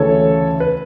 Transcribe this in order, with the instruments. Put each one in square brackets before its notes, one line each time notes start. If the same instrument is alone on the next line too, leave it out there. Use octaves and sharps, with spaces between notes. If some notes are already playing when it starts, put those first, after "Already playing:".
Already playing: [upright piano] D2 C#3 E3 A4 C#5
B4